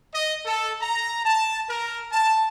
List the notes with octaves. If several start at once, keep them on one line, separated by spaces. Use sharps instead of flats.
D#5
A4
A#5
A5
A#4
A5